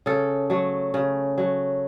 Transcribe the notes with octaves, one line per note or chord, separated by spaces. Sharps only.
C#3 A4
F#3 A3
C#3
F#3 A3